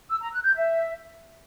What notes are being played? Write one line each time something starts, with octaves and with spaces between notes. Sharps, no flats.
E6
A#5
F#6
G6
E5